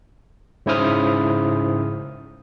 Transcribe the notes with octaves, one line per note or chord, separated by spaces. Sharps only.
G#2 C#3 E4 C5 D#6 F6